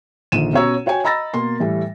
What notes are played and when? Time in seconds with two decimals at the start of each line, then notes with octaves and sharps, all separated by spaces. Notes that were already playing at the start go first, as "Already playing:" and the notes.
0.32 A#1 D3 D#3 D#7 E7
0.53 B2 C#4 F#4 C#5 A#5 E6
0.86 F#4 C#5 G5 G#5
1.04 D#5 A#5 B5 E6 A6 A#6
1.34 B2 A#3 C6
1.60 A2 E3 G3 A3